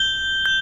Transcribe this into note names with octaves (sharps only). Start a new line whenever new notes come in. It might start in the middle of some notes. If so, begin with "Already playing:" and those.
Already playing: G6 G7
G6